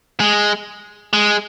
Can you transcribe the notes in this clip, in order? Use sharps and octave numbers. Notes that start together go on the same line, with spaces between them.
G#3
G#3